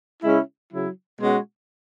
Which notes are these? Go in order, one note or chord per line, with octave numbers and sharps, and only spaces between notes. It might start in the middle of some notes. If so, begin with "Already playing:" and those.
C#3 G#3 C#4 E4
C#3 F#3 E4
B2 G#3 C#4 F#4